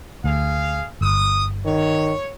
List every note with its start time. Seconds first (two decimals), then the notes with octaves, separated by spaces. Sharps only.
0.24 D2 G#4 F5
1.01 G1 D#6
1.66 D#3 C#5